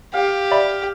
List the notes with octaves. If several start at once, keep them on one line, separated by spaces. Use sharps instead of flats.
G4 F5 G5
D5 E5 B5